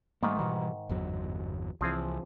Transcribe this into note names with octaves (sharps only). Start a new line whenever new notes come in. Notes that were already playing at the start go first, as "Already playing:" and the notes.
G#2 D#3 G3 A3 A#3
B2 E3 G3
G1 E2 F#3
C2 E3 F3 C4 G#4